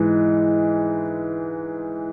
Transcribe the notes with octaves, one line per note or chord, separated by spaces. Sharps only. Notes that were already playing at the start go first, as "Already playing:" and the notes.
Already playing: G#2 E3 G#3